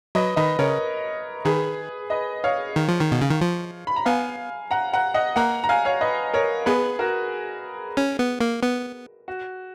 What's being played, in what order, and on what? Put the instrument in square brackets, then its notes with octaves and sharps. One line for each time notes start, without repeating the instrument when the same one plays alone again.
[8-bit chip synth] F#3 [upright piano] B4 D#5
[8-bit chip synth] D#3 [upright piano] B4 D#5
[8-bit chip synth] C#3 [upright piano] A#4 C#5
[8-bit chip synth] D#3 [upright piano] G#4 B4
[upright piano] B4 D#5
C#5 F5
[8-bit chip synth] D#3
F3
D#3
B2
C#3
D#3
F3
[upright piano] B5
A#5
[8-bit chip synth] B3 [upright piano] F5 G#5
[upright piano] F#5 A#5
F#5 A#5
D#5 F#5
[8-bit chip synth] A#3 [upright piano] F#5 A#5
[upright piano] A#5
F5 G#5
C#5 F5
B4 D#5
A#4 C#5
[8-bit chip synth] B3 [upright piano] G#4 B4
[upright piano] F#4 A#4
[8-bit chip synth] C#4
B3
A#3
B3
[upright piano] F#4